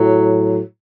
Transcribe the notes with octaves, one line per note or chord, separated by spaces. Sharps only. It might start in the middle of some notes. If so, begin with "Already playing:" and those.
Already playing: A2 F#3